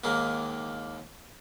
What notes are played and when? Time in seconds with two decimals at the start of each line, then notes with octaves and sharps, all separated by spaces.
0.04 D#2 G#2 D#3 A#3